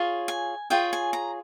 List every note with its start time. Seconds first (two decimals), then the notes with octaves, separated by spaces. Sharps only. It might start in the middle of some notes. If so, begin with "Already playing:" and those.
Already playing: F4 G#4 C#5
0.28 G#5
0.70 F4 G#4 C#5 G5
0.93 G#5
1.13 A#5